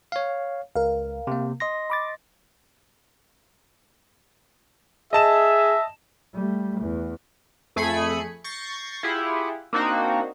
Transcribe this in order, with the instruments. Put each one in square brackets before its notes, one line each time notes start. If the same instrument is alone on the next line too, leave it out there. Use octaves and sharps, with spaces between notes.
[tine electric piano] C#5 F5
[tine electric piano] C#2 [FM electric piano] A#4 F5
[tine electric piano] C3 A#3
D#5 C6 A#6
[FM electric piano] B5 D6 A6
[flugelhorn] G#4 [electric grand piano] D#5 A5 E7 [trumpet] E5
[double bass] G3 A3
E2
[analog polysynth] F2 A3 G#4 G#5 B5 C#7
C#6 G6 A6 A#6 C7
E4 F4 G4 G#4 F#5
A#3 C4 D4 D#4 F#4